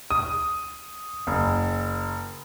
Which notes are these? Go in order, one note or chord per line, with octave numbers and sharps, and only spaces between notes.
D#6
F#1